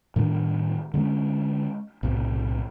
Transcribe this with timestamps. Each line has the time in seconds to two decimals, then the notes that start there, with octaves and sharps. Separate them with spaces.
0.16 A2 D#3 G3 D4
0.94 D3 G3 G#3 C#4
2.03 B1 A2 C3